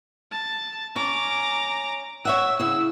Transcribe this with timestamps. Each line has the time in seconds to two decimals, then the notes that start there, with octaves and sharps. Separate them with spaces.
0.31 A5
0.96 C#4 A#5 D6
2.25 C#5 E5 F#5 E6
2.59 C#3 E4 E6